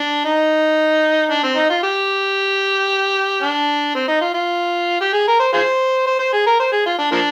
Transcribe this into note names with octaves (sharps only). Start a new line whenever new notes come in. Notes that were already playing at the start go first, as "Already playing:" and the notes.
Already playing: D4
D#4
D4
C4
D#4
F4
G4
D4
C4
D#4
F4
F4
G4
G#4
A#4
C5
F4 G#4 C5
C5
C5
G#4
A#4
C5
G#4
F4
D4
F3 A#3 D4